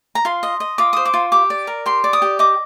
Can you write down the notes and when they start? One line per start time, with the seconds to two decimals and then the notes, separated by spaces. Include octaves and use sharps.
0.15 A#5
0.25 F4 C6
0.43 D#5
0.60 D#5
0.78 F4 D6
0.93 C5 D#6
1.05 D6
1.14 F4
1.32 G4 D6
1.50 D5
1.67 A#4
1.86 G4 C6
2.04 D5
2.13 D#6
2.22 G4
2.39 D#5 D6